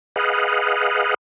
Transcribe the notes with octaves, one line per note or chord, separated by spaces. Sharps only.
G#4 B4 D#5 F5 F#5